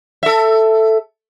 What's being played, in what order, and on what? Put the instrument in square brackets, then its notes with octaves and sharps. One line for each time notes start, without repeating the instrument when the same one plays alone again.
[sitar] A4 E5